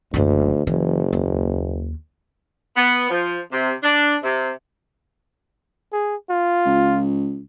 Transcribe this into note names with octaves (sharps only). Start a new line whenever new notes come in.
F#1 D2 D#4
F#1 E3
D#2
B3
F3
C3
D4
C3
G#4
F4
C#2